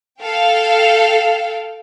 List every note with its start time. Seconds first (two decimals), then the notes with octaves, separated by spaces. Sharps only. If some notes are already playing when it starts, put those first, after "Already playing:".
0.22 A4 F5 G5